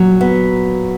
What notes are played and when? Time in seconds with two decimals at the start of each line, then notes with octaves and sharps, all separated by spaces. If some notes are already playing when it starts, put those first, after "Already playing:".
Already playing: A#2 F#3
0.21 B3